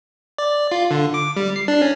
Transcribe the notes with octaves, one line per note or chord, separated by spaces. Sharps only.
D5
F4
D3
D6
G3
C7
D4
C#4